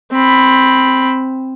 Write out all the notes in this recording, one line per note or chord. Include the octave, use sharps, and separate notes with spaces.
C4 B5